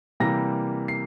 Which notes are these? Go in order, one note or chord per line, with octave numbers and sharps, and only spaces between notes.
C3 E3 G3 A#3 A#6
C7